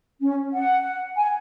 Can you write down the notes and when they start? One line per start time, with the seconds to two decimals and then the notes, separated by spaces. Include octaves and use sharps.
0.20 C#4
0.52 F#5
1.16 G#5